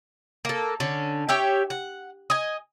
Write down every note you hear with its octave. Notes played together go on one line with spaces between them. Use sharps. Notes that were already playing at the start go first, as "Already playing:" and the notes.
A#3 A4
D3 C#4
G4 C#5 E5 G5
F#5
D#5 G#5